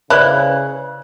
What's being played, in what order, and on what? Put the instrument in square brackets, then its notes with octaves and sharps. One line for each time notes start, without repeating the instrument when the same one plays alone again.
[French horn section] C#3 [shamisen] E4 [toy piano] B4 C5 D5 [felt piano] F#6